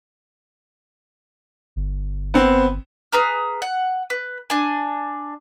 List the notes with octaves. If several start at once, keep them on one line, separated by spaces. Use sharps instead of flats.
G1
B3 C4
G#4 B4 A#5 F6
F#5
B4
D4 G#5